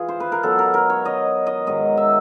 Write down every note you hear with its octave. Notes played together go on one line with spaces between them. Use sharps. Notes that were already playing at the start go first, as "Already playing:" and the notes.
Already playing: E3 F4 G#4
C5
B4
A#4
B2 F#3 A4
A#4
A#4
C#5
D#5
D#5
G#2 D#3 F#3 D#5
E5